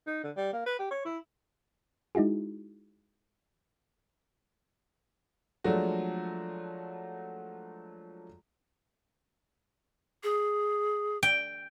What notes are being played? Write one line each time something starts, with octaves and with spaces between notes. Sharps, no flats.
D#4
D3
G3
A#3
B4
G4
C#5
E4
G#3 D#4 E4 F#4 G#4
F3 F#3 G#3 A3 D4 F#4
G#4
G5